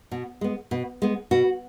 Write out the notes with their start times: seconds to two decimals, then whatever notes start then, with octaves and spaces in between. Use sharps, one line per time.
0.11 B2
0.41 G#3 B3
0.71 B2
1.02 G#3 B3
1.31 B2 F#4